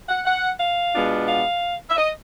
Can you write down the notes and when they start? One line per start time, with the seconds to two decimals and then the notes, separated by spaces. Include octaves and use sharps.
0.08 F#5
0.26 F#5
0.59 F5
0.94 B2 G#3 B3 D4 F4
1.28 F5
1.90 E5
1.97 D#5